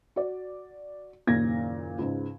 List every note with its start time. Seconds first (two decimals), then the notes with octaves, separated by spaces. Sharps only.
0.16 F#4 D5
1.27 F#1 D#2 A#2 G#6 A#6
1.99 C#2 G#2